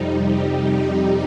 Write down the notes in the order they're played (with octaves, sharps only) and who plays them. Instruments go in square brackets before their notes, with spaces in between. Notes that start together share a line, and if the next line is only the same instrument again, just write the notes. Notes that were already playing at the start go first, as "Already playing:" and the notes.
Already playing: [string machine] F2 C3 G3 D#4
G4